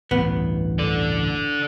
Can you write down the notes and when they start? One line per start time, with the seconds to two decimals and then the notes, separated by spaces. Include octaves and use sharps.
0.11 A1 D2 G2 B3
0.79 A4 D5